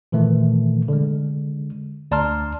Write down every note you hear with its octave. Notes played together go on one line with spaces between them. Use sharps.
A#2 D#3 E3 A3
D3 G#3
D2 D5 A5 A#5 C6 F6